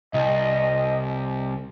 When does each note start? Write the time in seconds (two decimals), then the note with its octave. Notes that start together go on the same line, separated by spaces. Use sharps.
0.14 C2 D#5